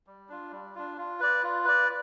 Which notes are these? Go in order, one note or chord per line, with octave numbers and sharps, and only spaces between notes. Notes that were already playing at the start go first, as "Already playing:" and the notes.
G3
D4 F4
G3
D4 F4
F4
B4 D5
F4
B4 D5